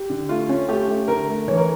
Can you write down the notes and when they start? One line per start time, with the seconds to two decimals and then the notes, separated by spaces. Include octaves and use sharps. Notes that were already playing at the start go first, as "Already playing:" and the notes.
Already playing: G4
0.10 D3
0.29 A3 F4
0.49 C#4
0.68 A3 G4
0.88 A3
1.08 D3 A#4
1.28 A3
1.48 E3 C#5
1.57 A#4